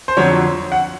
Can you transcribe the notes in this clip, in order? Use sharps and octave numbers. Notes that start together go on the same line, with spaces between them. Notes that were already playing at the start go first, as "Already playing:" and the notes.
C5
F2 D3 F#3 C#5
F#5